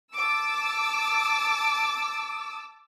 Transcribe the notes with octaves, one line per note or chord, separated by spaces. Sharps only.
A5 D6 E6